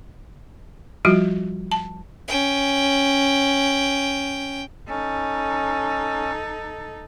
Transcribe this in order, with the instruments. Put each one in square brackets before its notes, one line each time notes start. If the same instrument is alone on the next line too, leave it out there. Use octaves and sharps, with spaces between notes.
[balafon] F3 G3 F4 F#4
A5
[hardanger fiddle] C#4 G5
[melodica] C#4 [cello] D#4 A4